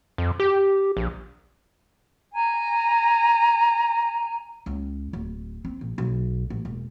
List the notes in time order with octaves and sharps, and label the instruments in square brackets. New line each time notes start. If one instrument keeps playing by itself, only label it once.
[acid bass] F2
G4
A#1
[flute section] G#5 A#5
[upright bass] C#2
D1
C4
A#1
B1
A1
E1